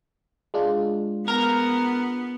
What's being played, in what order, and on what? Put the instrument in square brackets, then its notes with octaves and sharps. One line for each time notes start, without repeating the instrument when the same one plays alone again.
[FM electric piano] G#3 D4 F4
[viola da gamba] B3 [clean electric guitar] A#4